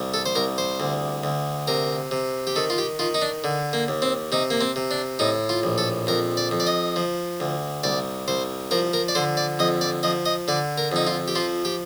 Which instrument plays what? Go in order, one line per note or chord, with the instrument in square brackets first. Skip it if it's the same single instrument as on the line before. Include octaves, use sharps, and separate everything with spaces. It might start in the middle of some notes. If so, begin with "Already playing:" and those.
Already playing: [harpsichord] C2
A4
C5
C2 A#4
C5
D2
D2
C3 A#4
C3
G4
D#3 A4
F4
G4
D#3 F4
D#4
D4
D3
A#3
D#2
C4
C3 D#4
A#3
C4
C3
D4
A2 D#4
F4
A#1
A4
F2 A#4
D5
F2
D5
D#5
F3
D2
C2 D5
C2 C5
F3 A#4
A#4
D5
D3 C5
D5
F2 D#5
D5
F3 D#5
D#5
D3 D5
A#4
F2 D#4
F4
G4
F3 F4
G4